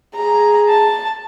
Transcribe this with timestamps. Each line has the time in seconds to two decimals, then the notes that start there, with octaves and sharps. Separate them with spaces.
0.15 G#4 A#5
0.69 A5